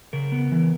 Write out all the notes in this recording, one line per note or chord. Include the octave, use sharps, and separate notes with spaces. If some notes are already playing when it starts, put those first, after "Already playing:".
C#3 A#4
B3
E3